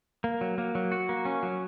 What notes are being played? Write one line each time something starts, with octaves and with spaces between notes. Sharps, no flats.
A#3
F#3
A#3
F#3
F#4
A#3
C#4
F#3